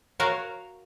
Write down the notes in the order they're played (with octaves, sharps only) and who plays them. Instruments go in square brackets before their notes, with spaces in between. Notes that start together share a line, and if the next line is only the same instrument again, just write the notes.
[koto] F#4 A#4 C#5 F5 F#5